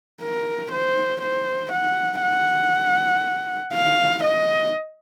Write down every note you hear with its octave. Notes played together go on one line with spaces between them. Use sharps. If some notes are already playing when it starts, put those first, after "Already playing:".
A#4
C5
C5
F#5
F#5
F5
D#5